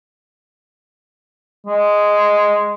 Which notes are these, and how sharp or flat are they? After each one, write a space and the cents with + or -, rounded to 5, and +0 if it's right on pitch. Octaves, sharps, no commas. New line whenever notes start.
G#3 -5